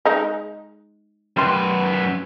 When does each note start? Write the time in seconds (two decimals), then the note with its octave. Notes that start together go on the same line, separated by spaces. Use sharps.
0.05 G#3 D#4
1.37 F#2 G3 B4 C6